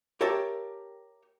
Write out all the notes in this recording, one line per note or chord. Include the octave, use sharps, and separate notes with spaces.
G4 A#4 C#5 E5 G5 A5